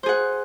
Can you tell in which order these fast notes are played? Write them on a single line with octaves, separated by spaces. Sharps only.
C5 G#4 F#5